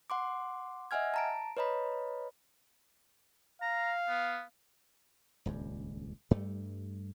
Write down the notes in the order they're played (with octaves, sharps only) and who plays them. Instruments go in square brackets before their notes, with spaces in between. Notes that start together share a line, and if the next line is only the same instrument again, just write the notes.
[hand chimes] F#5 C6 D6
D#5 E5 F#5 G#5 F6 G#6
A5 A#5 D7
B4 C#5 D#5 A#5 B5
[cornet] F5 [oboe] A#5
[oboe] B3
[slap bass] D#1 C#2 G2
G2 G3 A3